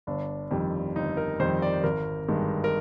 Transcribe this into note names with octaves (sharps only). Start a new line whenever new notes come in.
G1 D4
F2 D#3 G3
G1 D#4
A#4
F2 D#3 G3 C5
D5
G#1 A#4
G2 D#3 G#3
A#4